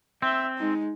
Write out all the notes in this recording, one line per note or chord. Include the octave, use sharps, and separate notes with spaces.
C4 E5
G#3 D#4